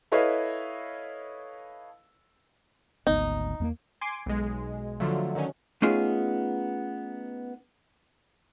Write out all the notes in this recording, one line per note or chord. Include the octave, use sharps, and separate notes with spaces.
E4 A4 B4 C#5 D#5 F5
G#1 D2 B3 D#4
E2 A3 A#3
G#5 C6 D6 C7 D7
B1 G#3
D3 F3 F#3 A3
D3 D#3 F#3 C#4
A3 B3 C#4 D#4 F4 G#4